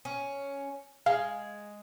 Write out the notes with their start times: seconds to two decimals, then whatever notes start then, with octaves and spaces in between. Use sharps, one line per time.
0.05 C#4
1.06 G#3 F5